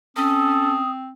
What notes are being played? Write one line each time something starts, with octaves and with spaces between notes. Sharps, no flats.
C4 C#4 A4 D#6